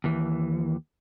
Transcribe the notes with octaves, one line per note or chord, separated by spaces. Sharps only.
D#2 E3